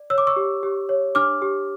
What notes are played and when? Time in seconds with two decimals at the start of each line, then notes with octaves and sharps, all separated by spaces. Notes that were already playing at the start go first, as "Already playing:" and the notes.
Already playing: D5
0.10 C#5 E6
0.18 D6
0.27 C#6 E6
0.36 G4
0.63 G4
0.89 C#5
1.15 D4 D6 F6
1.42 G4